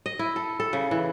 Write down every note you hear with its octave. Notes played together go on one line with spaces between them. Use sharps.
D#5
E4
A4
A4
C#3
E3